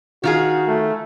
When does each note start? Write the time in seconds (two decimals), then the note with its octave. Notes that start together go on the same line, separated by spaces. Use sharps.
0.24 D#3 F4 F#4 G#4
0.68 A3